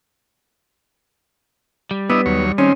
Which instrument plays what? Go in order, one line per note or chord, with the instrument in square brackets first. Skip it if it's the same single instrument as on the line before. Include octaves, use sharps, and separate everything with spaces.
[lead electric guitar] G3
[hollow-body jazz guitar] B3 [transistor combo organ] D4 E4 D#5
[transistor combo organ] D#2 F#3 C#5
[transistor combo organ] D#3 C4 [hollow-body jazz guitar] C#4